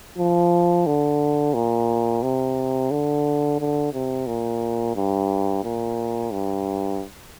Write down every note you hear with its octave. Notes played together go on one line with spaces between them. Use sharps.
F3
D3
A#2
C3
D3
D3
C3
A#2
G2
A#2
G2